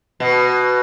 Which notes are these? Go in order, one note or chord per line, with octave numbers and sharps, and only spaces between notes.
B2